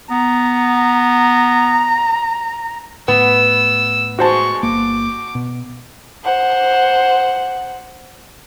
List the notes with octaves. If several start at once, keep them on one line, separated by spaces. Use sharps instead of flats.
B3 A#5
A2 B3 E6
G#3 F#4 C5 A5 C#6
G1 A#3 D6
B2
C5 F#5